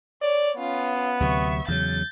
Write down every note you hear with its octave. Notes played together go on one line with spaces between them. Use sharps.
C#5 D5
B3 C#4 F4
D2 C3 F#3 E5 C#6
E2 C#3 F#3 G6 A6